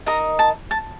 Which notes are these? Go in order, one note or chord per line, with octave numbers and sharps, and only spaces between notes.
D#4 A#4 D#5 A#5
A5
A5